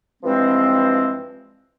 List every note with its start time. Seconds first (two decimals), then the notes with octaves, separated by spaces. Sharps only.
0.23 G2 E3 F3 G#3 C4